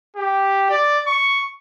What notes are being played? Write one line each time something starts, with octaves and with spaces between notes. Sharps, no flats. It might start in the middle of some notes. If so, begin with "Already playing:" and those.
G4
D5
C#6